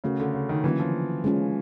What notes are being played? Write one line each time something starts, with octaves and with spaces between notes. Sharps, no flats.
C#3 A3 C#4 F#4 A#4
D3
C#3
D#3
D3 E3 F#3 A#3 C#4 F4
F3
G#3 C#4 F4